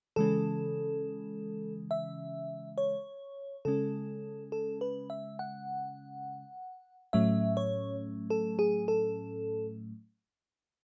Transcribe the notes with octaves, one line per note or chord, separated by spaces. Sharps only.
C#3 E3 G#3 C#4 A4
E5
C#5
C#3 G#3 C#4 A4
A4
B4
E5
F#5
A2 F#3 A3 C#4 E5
C#5
A4
G#4
A4